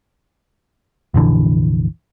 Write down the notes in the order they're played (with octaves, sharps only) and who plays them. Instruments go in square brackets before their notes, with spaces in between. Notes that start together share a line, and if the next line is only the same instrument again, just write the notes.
[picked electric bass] F1 A#1 D3 E3